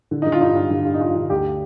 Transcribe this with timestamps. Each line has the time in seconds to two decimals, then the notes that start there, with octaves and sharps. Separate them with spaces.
0.11 D3
0.22 D#4
0.27 D3
0.32 F4
0.41 G2 D#4
0.56 G2
0.71 D3
0.85 G2
0.94 D#4
1.00 G2 F4
1.16 D3
1.30 D2 G4